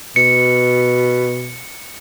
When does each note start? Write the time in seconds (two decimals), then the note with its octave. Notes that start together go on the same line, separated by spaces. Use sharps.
0.16 B2 C#7